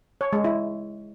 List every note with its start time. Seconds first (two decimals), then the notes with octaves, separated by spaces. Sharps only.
0.21 C#5
0.33 G#3
0.44 E4